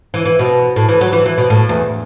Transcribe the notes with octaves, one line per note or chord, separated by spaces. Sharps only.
E3
E3
B2
A2
E3
F#3
E3
E3
B2
A2
E2